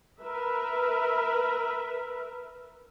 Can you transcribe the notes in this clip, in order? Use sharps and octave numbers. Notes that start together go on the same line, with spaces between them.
A#4 B4 E5